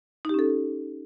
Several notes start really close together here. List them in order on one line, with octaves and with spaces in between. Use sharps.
D#4 G4 C#4 A4